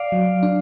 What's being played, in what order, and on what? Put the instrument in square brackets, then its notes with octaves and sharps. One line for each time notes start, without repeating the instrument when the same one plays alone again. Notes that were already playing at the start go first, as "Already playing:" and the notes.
Already playing: [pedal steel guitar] D5 F5
[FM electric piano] F#3
D4